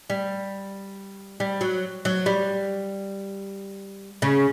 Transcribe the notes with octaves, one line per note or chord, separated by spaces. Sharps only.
G3
G3
F#3
F#3
G3
C#3